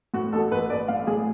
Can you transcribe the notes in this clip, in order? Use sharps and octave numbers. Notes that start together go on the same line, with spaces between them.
A2 F#4
A1 A4
A1 B4
A1 D5
A2 F5
A2 G#4